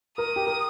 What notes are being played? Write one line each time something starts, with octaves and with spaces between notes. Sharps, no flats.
A#4 D#6
G4
A#4